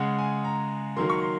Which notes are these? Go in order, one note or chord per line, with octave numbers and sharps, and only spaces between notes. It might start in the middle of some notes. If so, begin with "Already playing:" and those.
Already playing: C#3 G#3 F#5
G#5
A#5
D#3 F#3 A#3 C6
C#6
C6